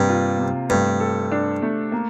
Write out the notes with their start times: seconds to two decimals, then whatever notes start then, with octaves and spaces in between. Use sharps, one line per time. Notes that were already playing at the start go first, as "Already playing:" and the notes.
Already playing: G2 C3 A#3
0.09 F4
0.39 C3
0.70 G2 A3
1.00 A4
1.32 D4
1.62 A3
1.92 A#3